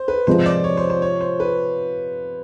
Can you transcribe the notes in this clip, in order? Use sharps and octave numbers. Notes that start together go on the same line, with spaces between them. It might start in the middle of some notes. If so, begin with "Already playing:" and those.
Already playing: C5
B4
C3 F3 G#3 C5
D5
C#5
C5
C5
C#5
C5
B4